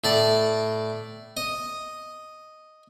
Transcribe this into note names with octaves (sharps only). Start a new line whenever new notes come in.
A2 D5 A5
D#5